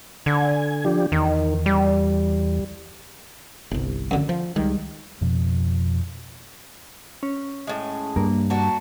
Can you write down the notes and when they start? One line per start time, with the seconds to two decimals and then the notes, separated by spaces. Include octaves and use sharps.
0.26 D3 G#5
0.85 F3 D4 G4
1.12 E2 D#3
1.66 G3
3.71 G1 C2
4.11 F#2 D3
4.29 F3
4.56 C#2 D#3 G3 G#3
5.21 F2 B2 F3
7.23 C#4
7.67 A2 G#3
8.16 G2 A#3
8.50 A#3 D4 F#4